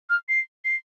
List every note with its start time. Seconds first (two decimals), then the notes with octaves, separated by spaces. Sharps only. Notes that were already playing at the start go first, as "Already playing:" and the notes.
0.10 F6
0.29 C7
0.65 C7